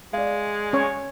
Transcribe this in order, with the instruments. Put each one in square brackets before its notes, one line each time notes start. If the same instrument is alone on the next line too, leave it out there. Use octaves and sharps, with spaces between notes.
[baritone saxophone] G#3 [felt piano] D5 F5
[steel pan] C#4 C#5